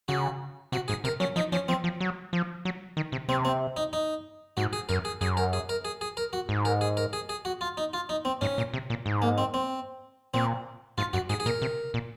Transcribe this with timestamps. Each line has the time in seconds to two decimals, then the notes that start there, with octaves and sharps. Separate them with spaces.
0.08 C#3 F#4
0.72 C3 F#4
0.88 G#2 G#4
1.04 C3 A#4
1.20 F#3 C#4
1.36 F3 D#4
1.52 F3 C#4
1.68 F3 C4
1.84 F3
2.00 F#3
2.33 F3
2.65 F#3
2.97 D#3
3.12 C3
3.28 C3 C4
3.45 C4
3.77 D#4
3.93 D#4
4.57 G#2 F#4
4.73 G#4
4.89 F#2 A#4
5.05 G#4
5.21 F#2 G#4
5.37 A#4
5.53 G#4
5.69 A#4
5.85 G#4
6.01 G#4
6.17 A#4
6.33 F#4
6.49 G#2
6.65 A#4
6.81 G#4
6.97 A#4
7.13 G#4
7.29 G#4
7.45 F#4
7.61 F4
7.77 D#4
7.93 F4
8.09 D#4
8.25 C4
8.41 G#2 C#4
8.58 A#2
8.74 C3
8.90 A#2
9.06 G#2
9.22 A#3
9.38 C4
9.54 C4
10.34 A#2 C4
10.98 G#2 F4
11.13 F#2 F#4
11.30 G#2 G#4
11.40 G#4
11.46 A#2 A#4
11.62 C3
11.94 A#2